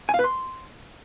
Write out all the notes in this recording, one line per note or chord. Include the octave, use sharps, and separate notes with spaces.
G#5
F5
B4
C6